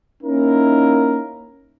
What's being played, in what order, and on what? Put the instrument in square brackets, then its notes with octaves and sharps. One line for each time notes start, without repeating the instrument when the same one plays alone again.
[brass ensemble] A#3 C#4 D#4 E4 A#4